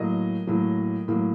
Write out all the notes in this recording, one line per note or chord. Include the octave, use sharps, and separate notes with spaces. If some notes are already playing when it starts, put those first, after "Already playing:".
Already playing: A2 F#3 A#3 D#5
A2 F#3 A#3
A2 F#3 A#3